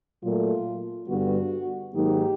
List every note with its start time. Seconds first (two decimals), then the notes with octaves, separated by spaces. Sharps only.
0.22 A#2 F#3 A3 F4
1.08 G2 D3 G3 B3 F#4
1.94 G#2 D#3 F#3 A#3 D#4 G4